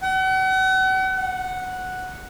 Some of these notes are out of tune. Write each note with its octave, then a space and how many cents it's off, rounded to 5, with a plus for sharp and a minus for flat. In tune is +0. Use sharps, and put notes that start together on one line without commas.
F#5 +40
F#5 -5